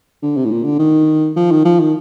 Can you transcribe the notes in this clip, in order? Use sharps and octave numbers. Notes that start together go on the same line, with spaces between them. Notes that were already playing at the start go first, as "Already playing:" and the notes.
D3
C3
A2
A#2
D3
D#3
F3
D#3
F3
D#3